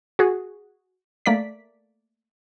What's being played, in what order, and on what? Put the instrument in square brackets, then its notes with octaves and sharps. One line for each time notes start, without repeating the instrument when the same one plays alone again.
[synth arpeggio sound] F#4 G#4
A3 A#3 D5 B6